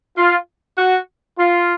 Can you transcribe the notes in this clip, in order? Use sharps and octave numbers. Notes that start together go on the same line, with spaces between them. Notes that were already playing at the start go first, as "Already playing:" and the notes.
F4
F#4
F4